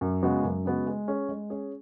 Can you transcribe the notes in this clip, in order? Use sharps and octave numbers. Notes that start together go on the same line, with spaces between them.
F#2
C#3 G#3 B3 F#4
F#2
C#3 G#3 B3 F#4
G#3
C#4 G#4
G#3
C#4 G#4